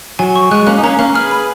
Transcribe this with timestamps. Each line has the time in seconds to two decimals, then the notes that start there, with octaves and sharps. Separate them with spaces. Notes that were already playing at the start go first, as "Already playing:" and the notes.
0.19 F#3 G#5
0.36 C#6
0.51 G#3 F#6
0.67 A#3 C#4 F#6
0.78 D#4
0.83 A#3 C#4 A#5
0.99 A#3 C#4 F5
1.15 G#4 B4 F6
1.31 B5